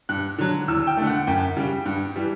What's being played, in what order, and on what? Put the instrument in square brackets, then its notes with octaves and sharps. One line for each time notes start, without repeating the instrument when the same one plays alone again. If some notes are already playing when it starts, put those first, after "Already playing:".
[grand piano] G2 F#6
D3 F#3
E2 E6
G5
D3 A3
F#5
F#2 G5
C#3 G3
G2
E3 G3